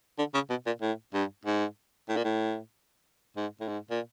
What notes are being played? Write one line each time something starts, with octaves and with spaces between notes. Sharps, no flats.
D3
C#3
B2
A#2
A2
G2
G#2
A2
A#2
A2
G#2
A2
G#2
A#2